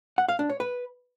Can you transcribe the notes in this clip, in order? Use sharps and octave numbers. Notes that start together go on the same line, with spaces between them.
F#5
F5
D4
C#5
B4